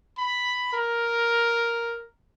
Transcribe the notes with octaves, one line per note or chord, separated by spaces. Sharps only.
B5
A#4